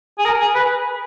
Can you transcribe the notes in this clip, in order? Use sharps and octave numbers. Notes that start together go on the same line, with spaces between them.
G#4
A#4
G#4
B4